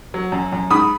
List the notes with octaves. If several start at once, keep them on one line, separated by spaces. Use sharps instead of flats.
F#3
F#2
F#2
G#2 B5 D#6